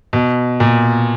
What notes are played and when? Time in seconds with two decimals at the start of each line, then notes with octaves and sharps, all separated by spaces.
0.13 B2
0.60 A#2